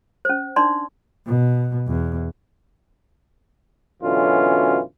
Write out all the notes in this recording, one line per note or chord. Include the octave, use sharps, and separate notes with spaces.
C#4 C5
D4 D#4 D5 C6
B2
E2
F#2 B2 D3 E3 C#4 F4